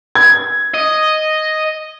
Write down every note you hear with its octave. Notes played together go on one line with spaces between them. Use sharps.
G#6
D#5